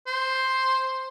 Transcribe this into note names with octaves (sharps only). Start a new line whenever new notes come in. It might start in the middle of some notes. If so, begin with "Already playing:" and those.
C5